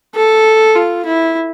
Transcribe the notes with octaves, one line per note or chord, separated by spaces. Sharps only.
A4
F4
E4